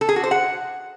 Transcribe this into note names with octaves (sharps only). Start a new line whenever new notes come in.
A4
G#4
F#4
C5
F#5